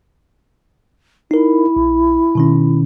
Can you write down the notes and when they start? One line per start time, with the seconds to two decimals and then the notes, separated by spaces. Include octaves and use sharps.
1.31 D#4 E4 A#4
1.76 A#1
2.35 B2 D#3 C#4